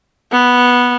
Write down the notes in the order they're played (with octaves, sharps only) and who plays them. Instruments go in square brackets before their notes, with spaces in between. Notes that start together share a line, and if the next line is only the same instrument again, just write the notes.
[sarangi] B3